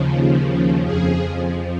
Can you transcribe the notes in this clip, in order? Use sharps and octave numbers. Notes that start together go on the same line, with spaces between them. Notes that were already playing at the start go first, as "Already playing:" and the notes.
Already playing: D#2 C#3 F3
F2 F3 G#4